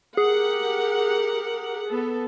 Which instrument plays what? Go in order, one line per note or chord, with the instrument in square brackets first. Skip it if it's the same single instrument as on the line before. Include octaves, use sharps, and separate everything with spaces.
[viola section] G4 A#4 F#5 [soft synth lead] G#4
[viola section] B3 A4